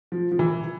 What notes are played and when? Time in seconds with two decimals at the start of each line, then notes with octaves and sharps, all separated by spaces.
0.12 F3
0.32 F3
0.39 E3